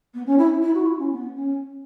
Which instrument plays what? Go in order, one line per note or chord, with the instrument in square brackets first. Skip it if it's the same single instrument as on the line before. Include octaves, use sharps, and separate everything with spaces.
[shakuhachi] B3
C#4
E4
E4
F#4
E4
C#4
B3
C#4